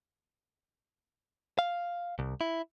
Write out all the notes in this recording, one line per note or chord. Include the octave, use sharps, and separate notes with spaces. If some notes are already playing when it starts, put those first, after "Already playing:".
F5
C2
E4